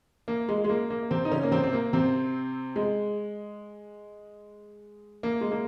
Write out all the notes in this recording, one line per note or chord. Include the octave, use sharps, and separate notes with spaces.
A#3
G#3
G#3
A#3
A#3
C3 C4
D#4
C#3 C#4
A#3
C3 C4
C4
A#3
C3 C4
G#3
A#3
G#3
A#3